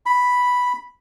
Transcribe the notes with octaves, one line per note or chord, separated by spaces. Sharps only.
B5